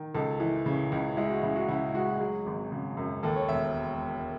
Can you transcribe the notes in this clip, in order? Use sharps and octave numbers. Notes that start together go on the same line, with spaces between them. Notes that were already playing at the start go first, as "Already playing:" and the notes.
Already playing: D#3
C#2 A4
E3
C#3
C#2
G#3 E4
F#4
C#3 E4
F#4
C#3 E4
G#3 F#4
F#3 G#4
G#1
C#3
F#2
D#2 A4
C#5
E1 E5